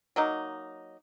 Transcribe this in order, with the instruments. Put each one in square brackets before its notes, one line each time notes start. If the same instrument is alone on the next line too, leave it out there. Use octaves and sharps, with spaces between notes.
[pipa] F#3 A#3 D#4